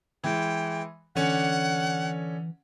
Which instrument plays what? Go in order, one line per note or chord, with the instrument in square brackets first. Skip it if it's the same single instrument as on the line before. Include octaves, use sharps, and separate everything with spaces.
[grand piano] E3 G#3 [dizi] G5
[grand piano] D3 C#4 D4 [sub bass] E3 [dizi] F#5